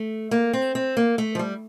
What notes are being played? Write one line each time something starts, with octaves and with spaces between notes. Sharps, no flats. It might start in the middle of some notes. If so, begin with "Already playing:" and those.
Already playing: A3
A#3
C4
C4
A#3
A3
F3
G3